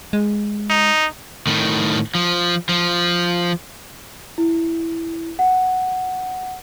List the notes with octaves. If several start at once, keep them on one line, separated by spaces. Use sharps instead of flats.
G#3
D#4
A2 D#3
F3
F3
E4
F#5